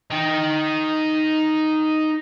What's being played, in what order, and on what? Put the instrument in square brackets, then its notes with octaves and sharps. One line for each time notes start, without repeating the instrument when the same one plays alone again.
[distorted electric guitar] D#4 G5